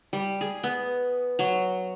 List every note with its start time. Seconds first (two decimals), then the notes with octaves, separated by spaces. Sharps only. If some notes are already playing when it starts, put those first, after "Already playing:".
0.13 G3
0.41 G#4
0.63 B3
1.39 F#3